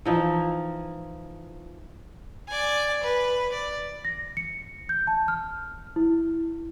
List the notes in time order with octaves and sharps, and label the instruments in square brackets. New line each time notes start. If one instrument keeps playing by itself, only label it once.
[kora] E3 F3 D#4
[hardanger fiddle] D5 G#5
B4
D5
[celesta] A#6
C#7
G6
A5
F6
E4